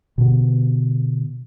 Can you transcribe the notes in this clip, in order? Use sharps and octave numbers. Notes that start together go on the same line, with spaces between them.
B2 D3 B3